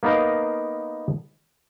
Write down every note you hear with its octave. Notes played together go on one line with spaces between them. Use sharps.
A#3 B3 D#4 A#4 F5